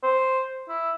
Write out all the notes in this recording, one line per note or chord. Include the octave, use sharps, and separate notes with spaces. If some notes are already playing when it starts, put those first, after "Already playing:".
C5
E4